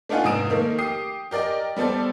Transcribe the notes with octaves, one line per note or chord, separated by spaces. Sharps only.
A3 D4 D#4 F4 F#5 G#5
F1 G#2 C4 D#6 D7 E7
D#3 A3 A#3
G4 D#6 C7
G4 A#4 D5 D#5 G5
G3 B3 A4 C5 D5